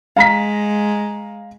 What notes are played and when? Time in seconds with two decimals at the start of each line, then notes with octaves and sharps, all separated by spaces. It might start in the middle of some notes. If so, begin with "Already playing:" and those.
0.17 G#3 F5 A#5 B6